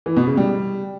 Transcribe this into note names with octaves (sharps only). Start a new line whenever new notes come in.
E3
B2
C#3
G3